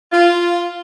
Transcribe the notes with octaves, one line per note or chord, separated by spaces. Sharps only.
F4